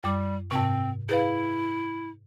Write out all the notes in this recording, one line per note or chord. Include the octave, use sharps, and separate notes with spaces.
F#2 G3 D6
G#2 C3 C4
E4 G#4 B4 F5